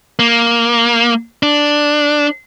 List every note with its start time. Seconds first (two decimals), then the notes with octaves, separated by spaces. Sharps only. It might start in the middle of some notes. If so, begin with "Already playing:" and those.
0.19 A#3
1.43 D4